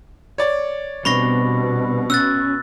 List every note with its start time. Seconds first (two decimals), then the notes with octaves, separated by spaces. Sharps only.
0.38 C#5 D5
1.05 B2 G3 C4 D4 B5 C#6 A#6
2.10 C#4 E6 F#6 A6